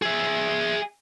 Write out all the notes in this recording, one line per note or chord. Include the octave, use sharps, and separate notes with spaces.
G#4 E5